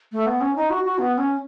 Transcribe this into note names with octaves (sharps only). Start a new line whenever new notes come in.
A3
B3
C#4
D#4
F#4
F#4
B3
C#4